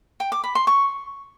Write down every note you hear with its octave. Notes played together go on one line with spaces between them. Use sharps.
G5
D6
B5
C6
C#6